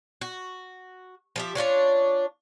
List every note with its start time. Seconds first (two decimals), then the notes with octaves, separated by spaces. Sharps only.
0.21 F#4
1.36 F3 G4 E5
1.55 C#4 D4 F4 C#5